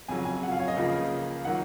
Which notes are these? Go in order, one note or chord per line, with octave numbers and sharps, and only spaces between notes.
F2 C#3 F#3 G#5
G#5
F#5
F5
C#5
D#5
C#2 C#3 F3 A#3
D#3 F#3 A#3 F#5